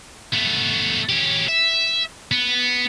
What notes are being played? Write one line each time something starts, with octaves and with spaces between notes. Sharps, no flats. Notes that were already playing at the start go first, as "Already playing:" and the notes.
A3 B3
C#4 G4
E5
B3